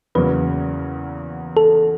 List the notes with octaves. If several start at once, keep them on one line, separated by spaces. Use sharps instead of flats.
E2 C#3 F#3 A#3 B4
A4